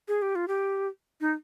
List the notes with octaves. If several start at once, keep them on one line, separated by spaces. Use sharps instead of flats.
G#4
G4
F4
G4
D#4